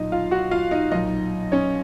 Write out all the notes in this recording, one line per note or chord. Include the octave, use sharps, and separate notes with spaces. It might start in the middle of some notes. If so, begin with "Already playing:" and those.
Already playing: B1 A#2 D#4 D#5
F4 F5
F#4 F#5
F4 F5
D#4 D#5
B1 A#2 D#4 D#5
C#4 C#5